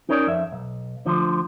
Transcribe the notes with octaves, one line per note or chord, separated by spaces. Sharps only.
C#4 D#4 A#4 C#5 D5
F2 E5
B1
D2 D3 F3